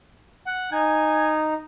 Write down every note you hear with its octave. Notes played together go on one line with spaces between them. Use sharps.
F#5
D#4 G#5